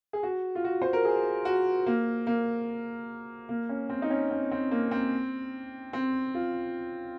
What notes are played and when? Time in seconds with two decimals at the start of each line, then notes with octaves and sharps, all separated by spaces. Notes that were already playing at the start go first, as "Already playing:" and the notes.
0.13 G#4
0.23 F#4
0.55 F4
0.64 F#4
0.82 C5
0.93 A#4
1.05 G#4
1.45 F#4
1.86 A#3
2.27 A#3
3.49 A#3
3.69 C#4
3.90 C4
4.02 D#4
4.10 C#4
4.31 C4
4.51 C4
4.71 A#3
4.91 C4
5.93 C4
6.35 F4